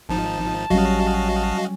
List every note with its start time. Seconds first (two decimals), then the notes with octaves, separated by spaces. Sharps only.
0.09 G#1 F3 D#4 A5
0.70 A1 F#3 G3 C#4 F#4 D#5 F5